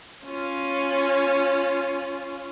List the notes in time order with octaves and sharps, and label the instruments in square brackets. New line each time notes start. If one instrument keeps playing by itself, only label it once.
[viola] C#4 F4